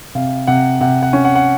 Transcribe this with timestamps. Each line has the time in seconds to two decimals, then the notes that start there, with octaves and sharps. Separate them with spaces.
0.15 C3 F5
0.47 C3 F#5
0.81 C3 F#5
1.03 F#5
1.13 C#4
1.25 F#5
1.35 F#5